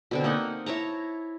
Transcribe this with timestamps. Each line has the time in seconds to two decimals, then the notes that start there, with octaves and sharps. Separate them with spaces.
0.11 B2 D3 C4
0.24 A#3 D#4 F#5
0.66 E4 C#5 A5 A#5